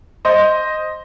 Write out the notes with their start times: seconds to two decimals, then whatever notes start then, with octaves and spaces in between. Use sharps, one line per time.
0.25 C5 D#5